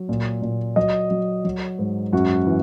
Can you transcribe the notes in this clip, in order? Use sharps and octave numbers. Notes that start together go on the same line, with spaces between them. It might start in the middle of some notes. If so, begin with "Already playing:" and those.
Already playing: F#3
A#2
A#2
F#3 D#5
F#3
F#3
G#2
F#2 F#4
E3